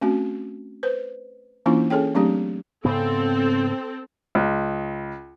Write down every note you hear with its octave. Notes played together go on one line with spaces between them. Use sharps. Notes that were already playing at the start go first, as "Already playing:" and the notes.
A3 C4 C#4 F#4
B4 C5
E3 A#3 C#4 D4 E4 F4
C#4 G#4 A4 C#5 G5
F#3 A3 C4 D4 G4
G#2 C#3 B3 C4 A4
C#2